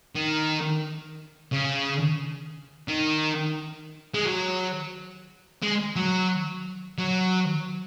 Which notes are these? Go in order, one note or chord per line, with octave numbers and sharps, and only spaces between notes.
D#3
C#3
D#3
G#3
F#3
G#3
F#3
F#3